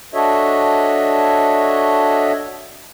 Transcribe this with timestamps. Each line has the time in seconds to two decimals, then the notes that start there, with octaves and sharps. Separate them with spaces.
0.14 D4 F#4 A4 C#5 D#5 E5